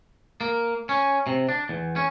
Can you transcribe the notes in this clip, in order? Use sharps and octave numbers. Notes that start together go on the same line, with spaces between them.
A#3
C#4
C3
D4
E2
C#4